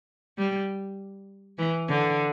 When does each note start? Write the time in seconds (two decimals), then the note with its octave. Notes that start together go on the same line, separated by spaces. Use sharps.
0.38 G3
1.58 E3
1.89 D3